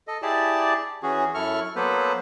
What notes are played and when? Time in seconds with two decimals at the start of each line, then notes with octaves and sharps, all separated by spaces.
0.08 A4 D#5
0.22 E4 G4 G#4 D5 A5
1.03 E3 C#4 F#4 G#4
1.34 F#2 E4 A4 C#6 F6
1.76 F#3 A#3 B3 A4 B4 C5